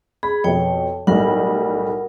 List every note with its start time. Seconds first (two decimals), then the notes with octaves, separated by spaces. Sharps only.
0.23 G#4 B5
0.44 F2 B2 C#5 G5
1.07 B1 A2 G3 A#4 F#5